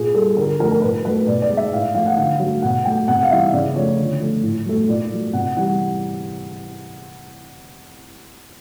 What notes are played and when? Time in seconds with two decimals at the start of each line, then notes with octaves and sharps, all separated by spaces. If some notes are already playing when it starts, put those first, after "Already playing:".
Already playing: A#2 G#4
0.14 G3 A4
0.37 D3 A#4
0.60 F3 A3 A#4
0.72 A#4
0.82 A#2 B4
1.05 F#3 A3 B4
1.27 B2 D5
1.42 D5
1.50 G#3
1.57 E5
1.72 A2 F5
1.95 F3 A3 F5
2.06 F#5
2.17 D3 F5
2.40 F#3 A3
2.62 B2 F#5
2.85 F#3 A3 G5
3.08 C3 F#5
3.23 F5
3.31 E3 G3 E5
3.53 C#3 D5
3.75 F3 A3 C#5
3.99 D3
4.20 F3 A3
4.43 A2
4.66 F#3 A3
4.88 A#2 D5
5.11 F#3 A3
5.33 C3 F#5
5.56 E3 G3 F#5